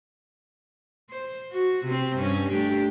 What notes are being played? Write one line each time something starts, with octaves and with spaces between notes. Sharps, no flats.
C5
F#4
C3 C4
G2 C#4
A3 D4 G4